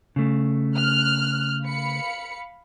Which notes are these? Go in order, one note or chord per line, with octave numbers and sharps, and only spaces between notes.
C#3 A3
F6 F#6
F5 B5 C#7